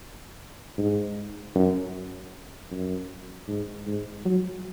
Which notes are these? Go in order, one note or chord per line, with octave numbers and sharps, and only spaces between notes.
G#2
F#2
F#2
G#2
G#2
F#3